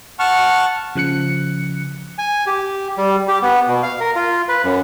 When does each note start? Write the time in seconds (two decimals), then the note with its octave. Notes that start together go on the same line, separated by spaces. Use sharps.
0.19 F#5 A5 C#6 F6
0.95 C#3 F3 F#6 C#7
2.18 G#5
2.47 G4
2.98 G3
3.28 G4
3.42 B3
3.68 B2
3.82 F5
4.00 A#4
4.16 F4
4.49 B4
4.64 F#2